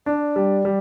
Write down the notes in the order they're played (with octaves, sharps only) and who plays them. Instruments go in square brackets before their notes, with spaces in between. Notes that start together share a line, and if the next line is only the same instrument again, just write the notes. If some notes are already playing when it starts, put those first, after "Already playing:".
[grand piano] D4 [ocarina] D5
[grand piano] G3
G3